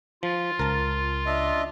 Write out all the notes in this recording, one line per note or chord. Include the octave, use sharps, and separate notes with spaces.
F3 F4
C#2 A#4 A5
D4 D#5 E5